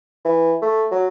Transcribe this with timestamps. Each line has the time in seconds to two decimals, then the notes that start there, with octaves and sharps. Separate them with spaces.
0.25 E3
0.62 A3
0.91 F#3